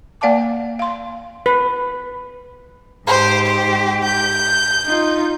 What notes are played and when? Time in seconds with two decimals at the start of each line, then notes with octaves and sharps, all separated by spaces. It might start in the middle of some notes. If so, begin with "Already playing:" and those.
0.21 A#3 D5 F5 F#5 A5 D6
0.79 F5 C6
1.46 B4
3.07 G#2 G4 C5
3.46 C5
4.04 G6
4.85 D#4 F4